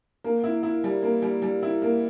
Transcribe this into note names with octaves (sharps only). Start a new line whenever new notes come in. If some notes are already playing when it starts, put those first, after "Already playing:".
A#3
E4
E4
G3
A#3
G3
G3
E4
A#3